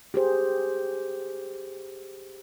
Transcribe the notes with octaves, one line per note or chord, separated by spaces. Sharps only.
G4 G#4 C5